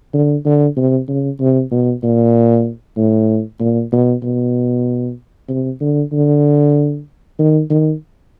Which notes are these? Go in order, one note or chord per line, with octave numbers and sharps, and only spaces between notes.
D3
D3
C3
C#3
C3
B2
A#2
A2
A#2
B2
B2
C3
D3
D3
D#3
D#3